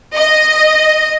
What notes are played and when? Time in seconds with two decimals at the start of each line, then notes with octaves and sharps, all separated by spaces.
0.16 D#5